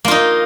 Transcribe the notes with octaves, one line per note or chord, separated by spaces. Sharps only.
A#3 D#4 F4